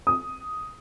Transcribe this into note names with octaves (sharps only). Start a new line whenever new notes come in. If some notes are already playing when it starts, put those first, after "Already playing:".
D#6